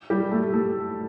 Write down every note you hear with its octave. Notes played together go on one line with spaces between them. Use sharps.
G3 G4
A3 A4
A3 A4